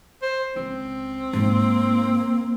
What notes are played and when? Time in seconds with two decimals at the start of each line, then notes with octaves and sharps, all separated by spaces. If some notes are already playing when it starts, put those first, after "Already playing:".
0.22 C5
0.56 C#2 C4
1.33 G#2 A#3 D#4